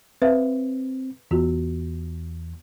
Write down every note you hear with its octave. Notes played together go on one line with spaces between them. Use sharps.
C4 B4 E5 F5
E2 B3 F4 F#4